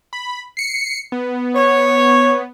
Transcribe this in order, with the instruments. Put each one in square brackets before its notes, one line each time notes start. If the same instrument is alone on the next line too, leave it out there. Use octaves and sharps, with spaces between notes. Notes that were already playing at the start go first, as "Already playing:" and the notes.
[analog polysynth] B5
C7 C#7
B3
[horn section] C#5